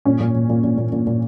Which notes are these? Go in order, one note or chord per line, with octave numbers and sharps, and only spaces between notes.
A#2 C#4
A#2
A#2
A#2
A#2
A#2
A#2
A#2